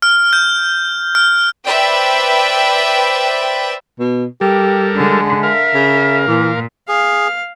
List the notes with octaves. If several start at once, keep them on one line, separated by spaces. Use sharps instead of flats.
F6
G6
F6
B4 C5 D5 E5 G5
B2
G3 G4 A4 A#4
D3 G#3
A#4 E5 F5
C#3
A#2 E3
G#4 F5